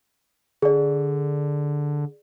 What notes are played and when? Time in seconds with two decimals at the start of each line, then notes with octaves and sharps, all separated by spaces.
0.62 D3 G#4 D5